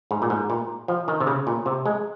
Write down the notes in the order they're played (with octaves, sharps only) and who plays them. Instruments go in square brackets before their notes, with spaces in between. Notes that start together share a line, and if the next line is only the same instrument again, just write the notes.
[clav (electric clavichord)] G#2
A#2
G#2
A#2
F3
D#3
C3
C#3
A#2
C3
G#3